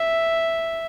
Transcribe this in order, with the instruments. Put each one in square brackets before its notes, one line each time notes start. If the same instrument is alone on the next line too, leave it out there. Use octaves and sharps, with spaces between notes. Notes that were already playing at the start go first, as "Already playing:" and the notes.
Already playing: [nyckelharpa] E5